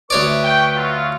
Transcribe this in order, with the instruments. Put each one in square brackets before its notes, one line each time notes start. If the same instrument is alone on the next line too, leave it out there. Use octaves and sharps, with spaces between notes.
[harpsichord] D2 C#5 D5 [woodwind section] B4 E5 C#6
[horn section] G5
F#3 F4